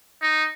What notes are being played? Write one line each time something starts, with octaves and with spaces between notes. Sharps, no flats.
D#4